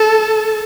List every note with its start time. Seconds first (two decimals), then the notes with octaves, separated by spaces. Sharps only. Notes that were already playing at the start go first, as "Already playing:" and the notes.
Already playing: A4